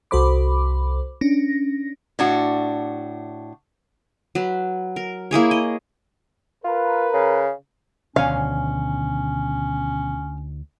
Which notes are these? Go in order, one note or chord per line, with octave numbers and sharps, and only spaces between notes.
C2 F#4 A4 C5 B5 D6
C#4 D4 A#6
A2 D4 F#4
F#3 B4
A#4
A#3 E4 G#4 C#5
D#5
F4 A#4 B4
C#3
D2 B2 D#3 F3 C#4 C#5 F5 G#5